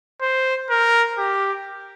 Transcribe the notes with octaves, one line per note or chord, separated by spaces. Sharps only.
C5
A#4
G4